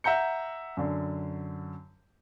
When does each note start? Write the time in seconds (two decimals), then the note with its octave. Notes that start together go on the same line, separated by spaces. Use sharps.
0.04 E5 F#5 A#5 G6 C#7
0.77 F#2 D3